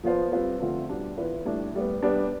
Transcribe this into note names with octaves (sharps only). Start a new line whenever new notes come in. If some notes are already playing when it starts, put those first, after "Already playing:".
F3 B3 F4 C5
G3 C4 F4 B4
D3 F3 A3 C4 F4
B2 G3 D4
E3 B3 F4 B4
A2 G3 D4
A2 G3 B3
G3 B3 D4